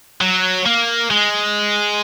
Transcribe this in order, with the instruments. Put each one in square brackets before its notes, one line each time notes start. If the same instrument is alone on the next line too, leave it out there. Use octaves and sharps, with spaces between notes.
[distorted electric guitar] F#3
A#3
G#3